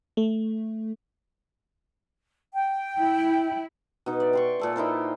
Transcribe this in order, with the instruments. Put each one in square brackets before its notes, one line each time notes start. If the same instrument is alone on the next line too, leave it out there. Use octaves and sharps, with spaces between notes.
[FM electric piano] A3
[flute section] G5
[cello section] E4
[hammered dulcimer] B2 D#4
D5 E5
G5 C6 C#6
A#2 A4 D5
D#4 E4 A#4 C5